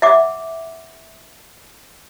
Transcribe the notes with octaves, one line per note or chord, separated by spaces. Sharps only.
E5 F#5 D6